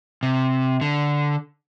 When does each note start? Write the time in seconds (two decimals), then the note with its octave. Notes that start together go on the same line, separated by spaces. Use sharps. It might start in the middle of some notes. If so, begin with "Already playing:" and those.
0.23 C3
0.81 D3